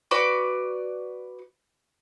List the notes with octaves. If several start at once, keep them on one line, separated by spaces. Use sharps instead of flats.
F#4 B4 D5